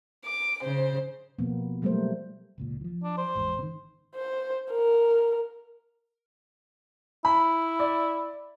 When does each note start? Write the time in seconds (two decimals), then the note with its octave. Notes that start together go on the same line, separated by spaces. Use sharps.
0.25 D6
0.63 C#3 C5
1.39 B2 F3 A#3 B3
1.82 F#3 G3 A3 A#3 A#4 C5
2.58 F1 C#2 A#2
2.81 E3 F3
3.04 D4
3.17 C5
3.35 G#1 E2 G#2
3.59 C3 D#3
4.15 C5
4.71 A#4
7.25 E4 B5
7.79 D5